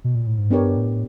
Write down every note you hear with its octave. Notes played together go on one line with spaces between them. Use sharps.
B2
A#2
A2
G#2
G2 B3 D4 G4 A#4 C#5
A2